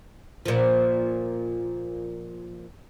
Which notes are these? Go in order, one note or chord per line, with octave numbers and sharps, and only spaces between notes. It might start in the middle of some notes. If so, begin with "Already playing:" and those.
A#2 F3